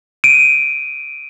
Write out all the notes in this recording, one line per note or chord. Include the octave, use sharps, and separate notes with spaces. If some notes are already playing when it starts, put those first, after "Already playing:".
D7 D#7